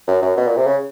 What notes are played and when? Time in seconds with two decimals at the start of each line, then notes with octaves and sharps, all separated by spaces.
0.08 F#2
0.22 F#2
0.37 B2
0.47 A#2
0.57 C3
0.67 C#3